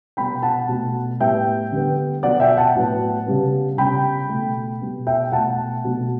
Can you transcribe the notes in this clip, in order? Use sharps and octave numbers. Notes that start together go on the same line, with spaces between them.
B2 G3 B3 G5 B5
F#5 A5
B2 A3
A2 G3 B3 E5 G5
D3 G3 B3
B2 F#3 B3 D5 F#5
E5 G5
F#5 A5
A2 F#3 B3
C#3 G3 B3
C#3 G3 B3 G5 B5
B2 A3
B2 G3 B3
E5 G5
B2 A3 F#5 A5
B2 F#3 A3